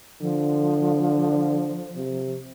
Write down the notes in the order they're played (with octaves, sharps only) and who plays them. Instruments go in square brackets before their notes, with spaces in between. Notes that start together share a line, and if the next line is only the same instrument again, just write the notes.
[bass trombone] D3 [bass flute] F3
[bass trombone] C3